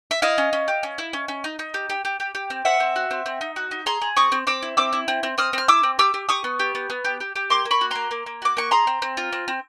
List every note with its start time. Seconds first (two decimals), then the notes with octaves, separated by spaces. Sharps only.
0.11 E5
0.22 E4 D#5 F5
0.38 C#4
0.53 C#4
0.68 G4
0.83 C#4
0.98 E4
1.13 C#4
1.28 C#4
1.44 D#4
1.59 D#4
1.74 G4
1.89 G4
2.05 G4
2.20 G4
2.35 G4
2.50 C4
2.65 C4 E5 F#5
2.80 C4
2.96 F#4
3.11 C4
3.26 C4
3.41 D#4
3.56 F#4
3.71 D#4
3.86 G#4 A#5 C6
4.02 G#4
4.16 C4 C#6 D#6
4.32 C4
4.47 C4 D6 E6
4.63 E4
4.77 C4 D6 E6
4.93 E4
5.08 C4
5.23 C4
5.38 C4 D#6 F6
5.53 C4 F6
5.68 E4 D6 E6
5.83 C4
5.99 G4 D6 E6
6.14 G4
6.29 G4 C#6 D#6
6.44 B3
6.59 G4
6.75 B3
6.90 B3
7.05 G4
7.20 G4
7.36 G4
7.50 A#3 C6 D6
7.65 A#3
7.71 B5 C#6
7.81 F#4
7.91 A#3 A#5 C6
8.11 A#3
8.26 A#3
8.42 F#4 D6
8.57 A#3 C#6
8.71 G#4 A#5 C6
8.87 C4
9.02 C4
9.17 F4
9.32 C4
9.48 C4